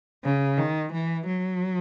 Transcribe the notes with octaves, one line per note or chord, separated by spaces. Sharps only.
C#3
D#3
E3
F#3